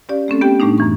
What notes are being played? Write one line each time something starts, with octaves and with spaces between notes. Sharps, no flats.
C#4 G4 D5 F5
A3 C4 C#4 A4
B3 G4 G5
A2 G3 A3 D4 D#4
F#2 E3 C#6